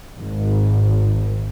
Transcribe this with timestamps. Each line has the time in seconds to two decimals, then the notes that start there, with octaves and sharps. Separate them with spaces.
0.18 G#1